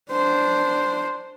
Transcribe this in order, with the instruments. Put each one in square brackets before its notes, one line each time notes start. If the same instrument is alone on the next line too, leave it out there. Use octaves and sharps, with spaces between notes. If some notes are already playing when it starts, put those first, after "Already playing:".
[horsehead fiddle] D4 C5